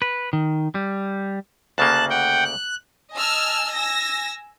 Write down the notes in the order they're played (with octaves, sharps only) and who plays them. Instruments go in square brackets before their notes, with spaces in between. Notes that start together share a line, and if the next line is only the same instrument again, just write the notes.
[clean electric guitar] B4
D#3
G3
[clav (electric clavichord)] D2 C#3 A#3 [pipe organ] A5 F#6
[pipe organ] F#5 G5
F#6
[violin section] D#5 G#5 A5 E6 F6
G#5 E6 A#6